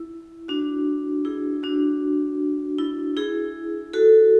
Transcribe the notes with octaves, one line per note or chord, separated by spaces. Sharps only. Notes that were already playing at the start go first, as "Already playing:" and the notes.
Already playing: E4
D4 F#4
E4 G#4
D4 F#4
E4
E4 G#4
F#4 A4